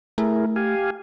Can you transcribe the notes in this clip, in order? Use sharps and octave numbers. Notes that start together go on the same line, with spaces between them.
A3 E4 G#4 A#4
G4 F5 G#5